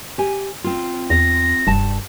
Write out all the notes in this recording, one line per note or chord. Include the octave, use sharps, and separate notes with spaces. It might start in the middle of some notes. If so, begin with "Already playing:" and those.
G4 G#5
C4 F4
E2 A#6
F1 G2 A5